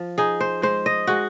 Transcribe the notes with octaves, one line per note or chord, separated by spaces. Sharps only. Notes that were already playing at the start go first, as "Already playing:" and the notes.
Already playing: F3
D#4 G#4
C5
G#3 C5
D#5
G#3 F#4